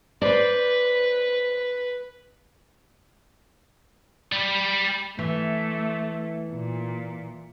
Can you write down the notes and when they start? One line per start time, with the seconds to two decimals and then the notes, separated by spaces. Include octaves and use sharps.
0.22 B4 C5 D5
4.32 G3
5.19 E3 A3
6.51 A#2